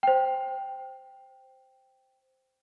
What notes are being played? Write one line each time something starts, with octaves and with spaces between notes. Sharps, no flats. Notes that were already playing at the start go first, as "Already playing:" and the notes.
C5 G5